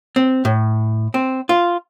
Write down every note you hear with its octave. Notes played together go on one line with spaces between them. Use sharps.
C4
A2
C4
F4